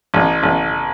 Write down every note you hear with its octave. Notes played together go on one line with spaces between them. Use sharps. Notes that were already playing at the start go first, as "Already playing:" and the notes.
A1
A1